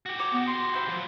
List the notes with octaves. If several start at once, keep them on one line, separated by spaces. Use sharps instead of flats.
F#4 G4
C#5 A#5 D6
B3
D5 C6
C5 E5 B5
F3 F#3